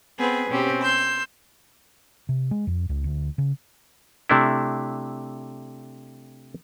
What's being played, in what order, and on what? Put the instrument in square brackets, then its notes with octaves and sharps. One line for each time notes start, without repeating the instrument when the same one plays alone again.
[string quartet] B3 C4 G#4 B4
B2 C4 C#4 G4
C6 E6 G6
[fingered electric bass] C3
G#3
F2
C#2
D2
C#3
[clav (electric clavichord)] C3 A3 D4 E4